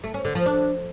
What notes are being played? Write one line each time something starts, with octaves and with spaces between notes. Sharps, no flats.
A3
C#4
D3
F3
D4